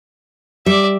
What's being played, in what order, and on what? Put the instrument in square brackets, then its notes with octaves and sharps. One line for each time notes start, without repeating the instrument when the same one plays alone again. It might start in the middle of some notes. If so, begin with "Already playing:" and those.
[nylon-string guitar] G3 [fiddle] D5 E5